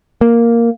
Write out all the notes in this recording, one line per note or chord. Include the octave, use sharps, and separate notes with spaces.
A#3